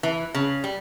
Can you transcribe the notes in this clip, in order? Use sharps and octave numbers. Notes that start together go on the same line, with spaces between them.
E3
C#3
G3